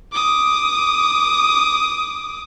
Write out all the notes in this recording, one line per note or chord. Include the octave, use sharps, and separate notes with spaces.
D6 D#6